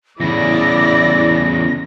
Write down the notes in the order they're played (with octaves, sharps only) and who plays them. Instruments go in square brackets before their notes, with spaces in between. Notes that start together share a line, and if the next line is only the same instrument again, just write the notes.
[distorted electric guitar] E2 C#3 [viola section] E4 D5 [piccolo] A#6